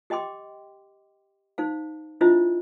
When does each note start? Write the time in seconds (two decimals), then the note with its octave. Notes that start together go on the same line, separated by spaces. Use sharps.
0.10 G4 D#5 G5 C6 D6
1.58 D#4 C5 F5
2.21 D4 E4 F4 C5 D#5 E5